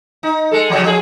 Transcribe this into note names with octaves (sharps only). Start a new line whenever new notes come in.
D#4
G#3 A4
C#3 F3 F#3
F3 G#4